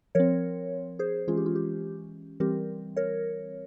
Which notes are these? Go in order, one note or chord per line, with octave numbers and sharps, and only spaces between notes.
F3 C4 A#4 C#5
G#4 C5
E3 G#3 C#4 F4 G#4
G4
F4
G4
E3 G3 C4 G4 A#4
A#4 C#5